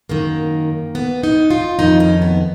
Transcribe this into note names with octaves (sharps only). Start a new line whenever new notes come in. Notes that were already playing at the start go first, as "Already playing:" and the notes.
F#2 D#3 A#3
B3
D#4
F4
F2 D#3 D#4
C#4
B3